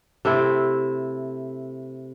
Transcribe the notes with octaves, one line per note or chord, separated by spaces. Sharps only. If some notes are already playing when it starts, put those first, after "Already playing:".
C3 A3 C4 E4